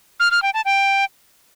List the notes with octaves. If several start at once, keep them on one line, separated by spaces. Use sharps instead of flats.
F6
F6
G5
A5
G5